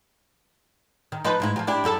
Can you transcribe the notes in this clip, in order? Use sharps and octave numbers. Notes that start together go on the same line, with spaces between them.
D#3
F3 D#4 B4
G#2 G#3 E4
F3 F#3
D4 E4 G4
F#2 E4 A4